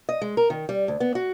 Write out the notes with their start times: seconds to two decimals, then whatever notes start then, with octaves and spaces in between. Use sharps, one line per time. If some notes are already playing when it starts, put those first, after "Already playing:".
0.09 D#5
0.22 G#3
0.37 A#4
0.50 D#3
0.69 G3
0.88 D2
1.00 B3
1.15 F#4